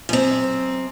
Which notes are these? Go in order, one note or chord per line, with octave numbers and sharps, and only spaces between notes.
F#2 C4